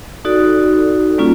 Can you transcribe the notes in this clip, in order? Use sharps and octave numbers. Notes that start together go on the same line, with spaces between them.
D#4 F#4 A4 D5
G3 A#3 C#4 F4